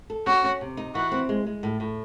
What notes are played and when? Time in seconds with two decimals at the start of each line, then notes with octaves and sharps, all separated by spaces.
0.10 A4
0.26 C#4 F#4
0.44 C#4
0.61 C3
0.77 D#4
0.95 E3 F#4
1.12 C4
1.29 G#3
1.47 G#3
1.63 A2
1.80 A2